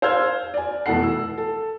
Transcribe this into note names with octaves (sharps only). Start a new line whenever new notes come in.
C5 F5 E6 F6 G6 G#6
D5 G#5
F1 B2 E3 A4 F#5 C7
E6
A4